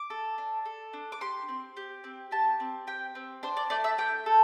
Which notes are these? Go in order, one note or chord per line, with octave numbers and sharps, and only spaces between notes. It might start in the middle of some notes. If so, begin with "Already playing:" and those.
Already playing: D6
A4
D4
A4
D4
D6
G4 C6
C4
G4
C4
G4 A5
C4
G4 G5
C4
D4 C5
D5
A3 D5
E5
A3 G5
A4